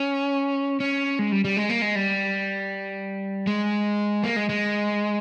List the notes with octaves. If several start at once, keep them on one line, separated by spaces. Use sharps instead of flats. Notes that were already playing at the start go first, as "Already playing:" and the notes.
Already playing: C#4
C#4
G#3
G3
G3
G#3
A#3
G#3
G3
G#3
A#3
G#3
G#3